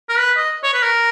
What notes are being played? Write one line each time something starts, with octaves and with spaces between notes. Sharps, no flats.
A#4
B4
D#5
C#5
B4
A#4